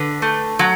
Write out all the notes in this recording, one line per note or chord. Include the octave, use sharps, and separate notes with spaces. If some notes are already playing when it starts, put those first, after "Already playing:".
Already playing: D3 B4
A3
F#3